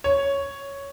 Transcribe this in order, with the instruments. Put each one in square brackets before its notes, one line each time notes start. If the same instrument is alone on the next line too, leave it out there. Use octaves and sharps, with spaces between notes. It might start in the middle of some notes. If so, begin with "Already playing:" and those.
[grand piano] C#5